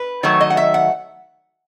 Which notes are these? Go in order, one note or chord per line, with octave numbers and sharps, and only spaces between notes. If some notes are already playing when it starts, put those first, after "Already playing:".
Already playing: B4
D#3 F#3 A3 C#5
D#5
F#5
E5
F#5